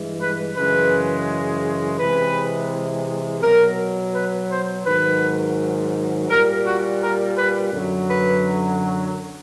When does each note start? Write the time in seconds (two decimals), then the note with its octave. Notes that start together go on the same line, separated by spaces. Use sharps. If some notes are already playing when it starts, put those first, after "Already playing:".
Already playing: G2 E3 G#3
0.20 B4
0.56 F#2 C#3 E3 G#3 B4
1.99 C3 E3 G#3 B4
3.43 B2 F#3 A#4
4.14 B4
4.50 C5
4.86 G#2 D#3 F#3 B4
6.29 A#2 G3 A#4
6.65 F#4
7.01 A#4
7.37 B4
7.72 F#2 D3 F#3
8.09 B4